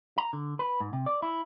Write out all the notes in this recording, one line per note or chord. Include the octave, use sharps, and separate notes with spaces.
A#5
D3
B4
G#2
C3
D5
E4